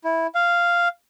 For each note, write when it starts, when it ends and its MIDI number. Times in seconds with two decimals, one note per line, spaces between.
0.04 0.27 64
0.35 0.88 77